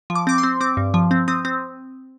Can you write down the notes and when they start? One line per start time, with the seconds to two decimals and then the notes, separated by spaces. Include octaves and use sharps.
0.10 F3
0.15 D6
0.27 C4 D6
0.38 C6
0.43 C4
0.61 C4 D6
0.77 G2
0.94 F3
1.11 C4
1.28 C4 D#6
1.45 C4